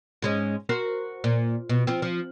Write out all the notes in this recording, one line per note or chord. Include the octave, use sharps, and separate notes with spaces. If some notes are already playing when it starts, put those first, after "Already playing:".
G#2 G#3 C#4
F#4 A#4 C5
A#2
B2
F3 C4
F3